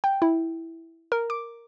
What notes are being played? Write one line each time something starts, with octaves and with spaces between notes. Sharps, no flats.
G5
E4
A#4
D6